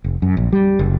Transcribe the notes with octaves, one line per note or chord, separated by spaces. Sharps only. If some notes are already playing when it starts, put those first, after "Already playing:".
F1
F#2
A#1
G3
F#1